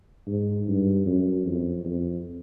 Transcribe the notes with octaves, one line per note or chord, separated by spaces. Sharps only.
G#2
G2
F#2
F2
F2